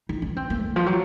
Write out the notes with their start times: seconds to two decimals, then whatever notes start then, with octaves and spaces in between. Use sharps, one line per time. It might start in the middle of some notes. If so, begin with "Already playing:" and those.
0.09 D#4
0.22 C#4
0.37 C4
0.50 A#3
0.65 D#3
0.76 F3
0.86 F#3